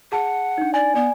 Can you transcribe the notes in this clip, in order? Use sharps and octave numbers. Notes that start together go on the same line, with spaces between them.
G#4 F#5 A5
D4 D#4
D5 G#5
B3 D5